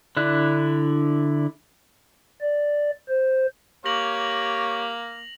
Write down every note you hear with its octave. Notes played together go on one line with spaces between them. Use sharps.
D3 D4 E4 F#6
D5
C5
A#3 G4 C#5 A#6 F7 F#7